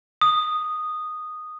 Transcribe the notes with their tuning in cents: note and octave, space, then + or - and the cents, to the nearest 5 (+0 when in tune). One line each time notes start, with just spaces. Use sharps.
D#6 -10